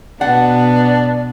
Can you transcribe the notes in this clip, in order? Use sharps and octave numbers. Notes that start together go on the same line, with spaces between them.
B2 B3 D4 F#5